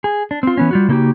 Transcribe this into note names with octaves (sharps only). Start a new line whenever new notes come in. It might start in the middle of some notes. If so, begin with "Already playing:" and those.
G#4
D4
C4 F4
E3 B3 C#4
G3 F4 F#4
C#3 A3 A#3 D#4 F#4 G4